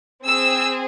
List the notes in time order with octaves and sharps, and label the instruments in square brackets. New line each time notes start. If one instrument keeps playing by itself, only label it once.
[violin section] C4 G#4 E6